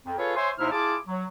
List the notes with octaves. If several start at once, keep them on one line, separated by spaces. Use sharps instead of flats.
F2
F4 G#4 A4 B4 C#5
C5 C#5 E5 G#5 C6
D#2 C3 D#4 E4 C5 F6
E4 F4 G#4 A5 D6
F#3